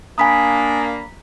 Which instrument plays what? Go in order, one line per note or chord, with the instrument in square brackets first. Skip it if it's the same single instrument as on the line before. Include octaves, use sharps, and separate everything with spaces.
[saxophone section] A#3 D4 [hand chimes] G#5 D#6 [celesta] A#5 B5 B6